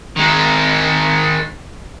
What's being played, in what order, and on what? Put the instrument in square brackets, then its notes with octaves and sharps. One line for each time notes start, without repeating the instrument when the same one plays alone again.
[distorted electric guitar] D#3 G#3